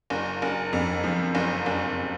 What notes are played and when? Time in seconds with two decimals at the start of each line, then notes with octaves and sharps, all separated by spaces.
0.10 F#1
0.42 F#1
0.73 F2
1.04 F3
1.35 F#1
1.66 F#1